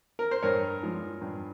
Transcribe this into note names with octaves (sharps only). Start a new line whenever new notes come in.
A#4
C5
G2 A#4 C#5
F3 G#3
G2